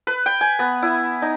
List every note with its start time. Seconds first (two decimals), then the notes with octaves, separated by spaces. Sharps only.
0.07 B4
0.26 G5
0.41 G#5
0.59 B3
0.83 E4
1.22 D#4